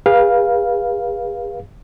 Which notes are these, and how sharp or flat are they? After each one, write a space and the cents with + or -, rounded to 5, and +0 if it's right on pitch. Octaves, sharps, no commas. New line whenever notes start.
G#4 -40 B4 -35 F5 +0